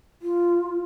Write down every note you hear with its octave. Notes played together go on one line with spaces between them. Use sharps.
F4